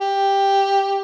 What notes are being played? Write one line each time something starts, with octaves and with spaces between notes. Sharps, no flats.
G4